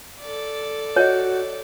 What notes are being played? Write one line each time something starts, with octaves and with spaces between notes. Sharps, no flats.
A4 D5
F#4 C#5 D#5